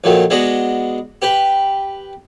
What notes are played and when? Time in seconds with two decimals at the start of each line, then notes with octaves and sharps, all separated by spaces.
0.04 A#1 A#2 D#3 F#3 A3
0.30 G#3 B3 D4 F#4 D#5
1.22 G4 B4 G5